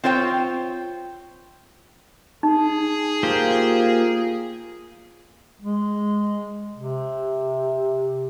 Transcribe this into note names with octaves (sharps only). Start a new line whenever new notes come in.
C4 F4 C5 C#5 G5
D#4 G#4
A#3 F4 G4 C5
G#3
C3